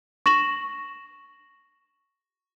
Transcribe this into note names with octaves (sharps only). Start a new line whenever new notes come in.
C#6 A#6 E7 F#7